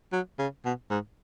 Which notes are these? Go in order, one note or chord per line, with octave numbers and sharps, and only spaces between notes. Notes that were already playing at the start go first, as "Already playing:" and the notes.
F#3
C#3
B2
G#2